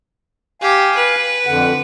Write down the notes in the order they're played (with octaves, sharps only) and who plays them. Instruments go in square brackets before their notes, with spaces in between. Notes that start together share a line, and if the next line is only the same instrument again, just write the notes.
[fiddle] G4 [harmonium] F5 G#5
[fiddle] B4
[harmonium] F2 D3 F#5